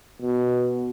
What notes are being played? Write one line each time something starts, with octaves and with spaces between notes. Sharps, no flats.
B2